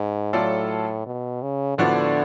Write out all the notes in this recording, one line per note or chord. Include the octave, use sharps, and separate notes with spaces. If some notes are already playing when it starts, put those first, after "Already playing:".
Already playing: G#2
A2 F#3 A3 F4 A4 D5
B2
C#3
A2 D3 F3 B3 D4 F#4